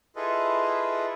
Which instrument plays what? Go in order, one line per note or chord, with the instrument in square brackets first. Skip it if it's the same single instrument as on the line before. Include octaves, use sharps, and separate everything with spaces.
[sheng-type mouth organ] E4 F4 G#4 A4 B4 D#5